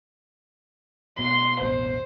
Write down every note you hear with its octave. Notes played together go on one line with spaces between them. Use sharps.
B2 C6
A1 E2 B2 C5